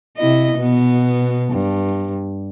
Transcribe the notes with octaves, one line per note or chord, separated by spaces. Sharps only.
C3 E4 D#5
B2 B3
G2